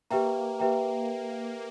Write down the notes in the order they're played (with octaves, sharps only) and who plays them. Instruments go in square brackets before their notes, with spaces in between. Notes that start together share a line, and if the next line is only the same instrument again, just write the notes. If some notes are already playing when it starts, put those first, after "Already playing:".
[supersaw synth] A#3 [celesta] G4 B4 E5 G5 A#5
[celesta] G4 B4 E5 G5 A#5